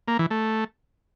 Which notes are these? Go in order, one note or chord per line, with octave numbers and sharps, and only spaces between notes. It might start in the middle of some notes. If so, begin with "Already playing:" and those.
A#3
E3
A3